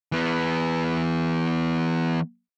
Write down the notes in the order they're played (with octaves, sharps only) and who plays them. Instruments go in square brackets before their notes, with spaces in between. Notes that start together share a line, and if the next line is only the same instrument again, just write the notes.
[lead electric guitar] E3 B3